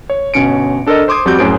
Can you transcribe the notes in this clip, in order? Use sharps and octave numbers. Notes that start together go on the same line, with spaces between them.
C#5
G1 B2 C#4 C#7 D7
D4 A4 A#4 C5 D#5
C5 C6 D6 D#6 G#6
F2 G3 C4 F#4 D6 G6
F#2 A2 G#4 C5 D7